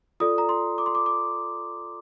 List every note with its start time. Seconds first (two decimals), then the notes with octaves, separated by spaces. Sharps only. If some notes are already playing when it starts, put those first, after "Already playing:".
0.20 F4 A4 D5 D#6
0.38 A#5
0.49 C6
0.78 D6
0.86 C6
0.95 D6
1.06 D6